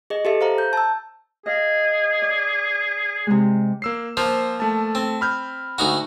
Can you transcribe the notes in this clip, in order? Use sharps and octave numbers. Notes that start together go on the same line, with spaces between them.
G#4 D#5
G4 A4 E5
C5 F5 A#5
G6
A5 E6
G#4 D#5 F5
D5
C3 G#3
A#3 E6 C7
F3 A#3 C5
A3 A5
C4
B5 F6 G6
D2 D#4 F#4